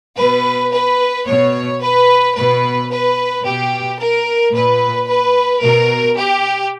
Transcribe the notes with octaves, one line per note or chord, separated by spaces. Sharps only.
B2 B4
B4
B2 C#5
B4
B2 B4
B4
B2 G4
A#4
A#2 B4
B4
B2 A#4
G4